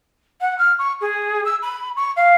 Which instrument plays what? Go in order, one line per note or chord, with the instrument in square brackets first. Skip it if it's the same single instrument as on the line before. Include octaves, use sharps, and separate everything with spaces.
[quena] F#5
F6
C#6
G#4
E6
B5
C#6
F5